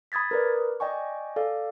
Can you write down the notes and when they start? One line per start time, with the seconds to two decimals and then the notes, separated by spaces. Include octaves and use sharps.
0.12 B5 D#6 G#6 A6 B6
0.31 A#4 B4 D5
0.80 D5 D#5 G5 G#5 C#6
1.36 A4 D5 F5